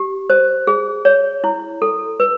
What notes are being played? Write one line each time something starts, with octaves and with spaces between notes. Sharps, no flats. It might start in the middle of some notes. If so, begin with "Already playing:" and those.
Already playing: G4
C5
G#4
C#5
E4
A4
B4